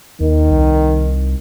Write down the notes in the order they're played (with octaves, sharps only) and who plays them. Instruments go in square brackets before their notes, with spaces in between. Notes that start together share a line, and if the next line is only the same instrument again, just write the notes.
[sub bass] D#2 [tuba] D#3
[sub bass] C2